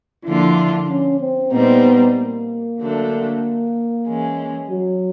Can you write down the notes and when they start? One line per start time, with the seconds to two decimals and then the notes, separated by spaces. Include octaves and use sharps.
0.25 D3 F3 A#3 D4 E4 F4
0.89 C#4
1.21 C4
1.52 A#2 G3 B3 C4 D#4
2.16 A#3
2.79 D3 F#3 A3 D4
4.06 E3 G#3 C#4
4.70 F#3